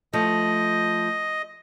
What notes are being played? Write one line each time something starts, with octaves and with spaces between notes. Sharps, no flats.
F3 A3 D#5